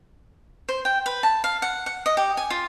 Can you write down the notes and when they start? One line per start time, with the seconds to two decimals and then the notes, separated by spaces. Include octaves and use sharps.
0.69 C5
0.85 G5
1.06 B4
1.23 A5
1.44 F5
1.62 F#5
1.86 F#5
2.06 D#5
2.17 G4
2.37 G#5
2.50 F4